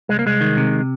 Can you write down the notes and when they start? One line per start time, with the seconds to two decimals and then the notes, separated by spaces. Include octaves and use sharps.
0.09 C2 G#3
0.19 A#3
0.26 C2 G#3
0.41 D#3
0.57 C3